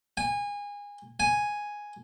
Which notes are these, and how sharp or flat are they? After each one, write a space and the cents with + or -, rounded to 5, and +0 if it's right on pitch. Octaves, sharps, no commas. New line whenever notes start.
G#5 -25
G#5 +0